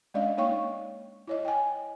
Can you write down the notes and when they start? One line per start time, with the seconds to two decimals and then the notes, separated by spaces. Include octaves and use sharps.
0.14 G#3 C#4 D4 D5 D#5 F5
0.37 A#3 D#4 C#5 F5 G5 C#6
1.28 E4 C#5 D#5
1.45 G5 G#5